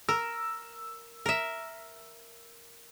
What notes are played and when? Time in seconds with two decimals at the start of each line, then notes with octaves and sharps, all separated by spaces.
0.09 A#4 E6
1.26 A#4 E5